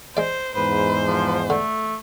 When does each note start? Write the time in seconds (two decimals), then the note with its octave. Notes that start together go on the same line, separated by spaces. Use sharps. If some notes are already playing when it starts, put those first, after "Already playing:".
0.17 G#3 C5 D5
0.56 E2 G#2 B4 C5
1.07 F3
1.50 D3 A3